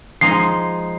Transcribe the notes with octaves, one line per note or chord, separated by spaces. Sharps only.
F3 G#3 D#4 C7